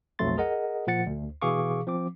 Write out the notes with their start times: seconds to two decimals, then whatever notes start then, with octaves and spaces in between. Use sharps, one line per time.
0.19 B1 F2 F#3 A3 C6 A6
0.38 G#4 A#4 D#5 F#5
0.87 A#2 F3 F#5 A6 C#7
1.06 D2
1.42 B2 E3 G#4 F5 C#6 D6
1.87 F3 C4 D6